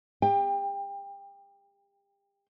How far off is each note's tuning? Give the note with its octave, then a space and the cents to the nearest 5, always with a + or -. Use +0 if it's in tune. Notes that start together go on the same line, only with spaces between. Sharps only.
G4 +40 G5 +25